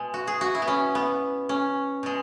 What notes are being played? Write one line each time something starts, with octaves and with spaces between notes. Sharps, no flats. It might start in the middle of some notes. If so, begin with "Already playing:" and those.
Already playing: B2 G#3
F#4
G#4
F#4
E4
B3
C#4
B3
C#4
B2 G#3